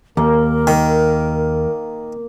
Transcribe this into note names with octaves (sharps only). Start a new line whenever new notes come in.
D#2 A#3 A#4
D#3